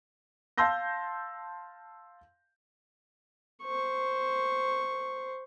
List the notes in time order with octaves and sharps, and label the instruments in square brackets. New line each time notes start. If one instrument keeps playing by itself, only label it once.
[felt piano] F5 A5 C6 E6 G6 A#6
[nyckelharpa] C5 C#6